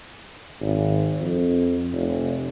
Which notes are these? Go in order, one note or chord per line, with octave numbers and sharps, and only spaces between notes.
G#1
F2
F1